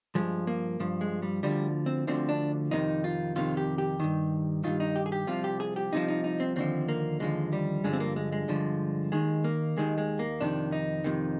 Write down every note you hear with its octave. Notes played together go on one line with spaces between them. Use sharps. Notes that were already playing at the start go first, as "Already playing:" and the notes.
G2 F3 G#3
A#3
G2 F3
G#3
G3
D2 D3 F3 G3
C4
D2 D3 F3 C4
D4
F2 C3 D#3 D#4
F4
F2 C3 D#3 F4
G4
G4
G2 D#3
G2 D#3 F4
D#4
G4
G#4
G4
C2 C3 F3 F4
G4
G#4
G4
C2 C3 F3 D#4
D#4
D#4
C4
D#2 D3 F3 C4
A#3
D#2 D3 F3 G#3
G3
G2 D3 F3 G#3
C4
A#3
G#3
G#3
G2 D3 F3
D#2 D#3 G#3
A#3
D#2 D#3 G#3
G#3
A#3
F2 C3 D#3 D4
D#4
F2 C3 D#3